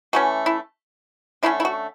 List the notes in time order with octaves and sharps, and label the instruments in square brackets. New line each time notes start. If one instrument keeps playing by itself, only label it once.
[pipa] E3 A3 C#4 F#4
E4
D3 A3 C#4 E4
E4
F#4